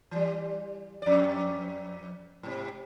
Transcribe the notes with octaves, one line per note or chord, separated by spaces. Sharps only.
E3 G3
F2 D5
G#2 C3